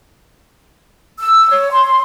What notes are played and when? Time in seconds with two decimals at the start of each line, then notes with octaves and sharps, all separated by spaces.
1.19 E6
1.50 C#5
1.71 C6